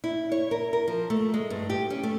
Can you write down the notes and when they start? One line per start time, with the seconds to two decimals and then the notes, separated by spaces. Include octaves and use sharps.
0.04 E4
0.32 C#5
0.51 A#4
0.73 A#4
0.88 F3
1.10 A3
1.34 G#3
1.50 G2
1.70 G4
1.90 C#4
2.03 A3